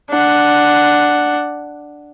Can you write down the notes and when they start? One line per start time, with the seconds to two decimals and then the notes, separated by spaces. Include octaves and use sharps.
0.10 D4 F#5